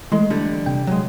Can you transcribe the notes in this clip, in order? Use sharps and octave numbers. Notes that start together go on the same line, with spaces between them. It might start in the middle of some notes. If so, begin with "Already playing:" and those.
E3 G#3 A3 C6
D3 G3
C3 G5
F#3 G#3